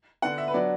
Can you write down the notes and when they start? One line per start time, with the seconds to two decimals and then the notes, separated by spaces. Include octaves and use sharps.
0.22 D3 B3 D4 F#5
0.38 E5
0.48 B4
0.54 F#3 B3 D4 D5